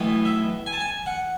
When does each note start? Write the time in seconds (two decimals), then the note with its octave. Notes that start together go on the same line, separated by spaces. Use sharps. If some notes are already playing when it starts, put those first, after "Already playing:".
Already playing: B1 A2 E3 B3
0.25 E5
0.66 G#5
0.72 A5
0.80 G#5
1.06 F#5